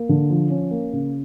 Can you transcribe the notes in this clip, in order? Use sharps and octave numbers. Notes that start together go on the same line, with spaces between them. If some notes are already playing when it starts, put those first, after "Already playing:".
Already playing: A#3
D3
F3
C#4
A#3
C#3